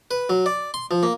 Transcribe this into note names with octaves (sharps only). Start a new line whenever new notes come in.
B4
F#3
D5
C6
F3
A#3